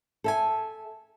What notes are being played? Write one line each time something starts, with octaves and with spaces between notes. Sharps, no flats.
A4 E5 G#5